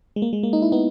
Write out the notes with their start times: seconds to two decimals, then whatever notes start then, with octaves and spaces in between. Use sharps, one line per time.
0.16 G#3
0.22 A#3
0.33 G#3
0.43 A#3
0.53 D#4
0.62 E4
0.72 B3 D#4